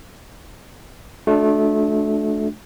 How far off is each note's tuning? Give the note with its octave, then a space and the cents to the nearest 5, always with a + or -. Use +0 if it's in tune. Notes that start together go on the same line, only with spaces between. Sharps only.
A3 -25 D4 +0 F#4 -35